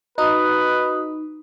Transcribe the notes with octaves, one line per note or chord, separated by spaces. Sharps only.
D#4 F#4 B4 D#6